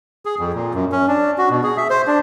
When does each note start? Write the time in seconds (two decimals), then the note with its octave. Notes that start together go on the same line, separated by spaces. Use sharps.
0.26 G#4
0.39 F2
0.54 A#2
0.75 F#2
0.92 C#4
1.08 D4
1.38 F#4
1.50 B2
1.63 G#4
1.77 E5
1.90 C5
2.07 D4